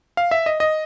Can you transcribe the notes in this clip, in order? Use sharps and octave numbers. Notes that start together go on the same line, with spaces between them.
F5
E5
D#5
D#5